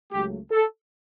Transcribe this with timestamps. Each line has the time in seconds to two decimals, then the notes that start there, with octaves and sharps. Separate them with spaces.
0.11 C#2 C#3 F#3 A3 G4
0.50 A4